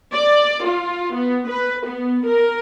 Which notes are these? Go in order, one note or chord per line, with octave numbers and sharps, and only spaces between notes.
D5
F4
B3
B4
B3
A#4